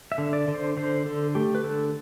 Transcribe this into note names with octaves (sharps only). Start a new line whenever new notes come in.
E5
D3
D5
D3
C5
D3 C5
D3 A4
A3 G4
B4
D3 A4